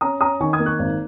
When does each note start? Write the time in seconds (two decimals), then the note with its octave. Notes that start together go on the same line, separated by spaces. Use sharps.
0.01 C#4 A#5 D#6
0.21 C#4 A#5 D#6
0.40 D#3 G#5 C#6
0.53 D#6 G#6
0.59 A#3
0.66 C#6 F#6
0.79 G#1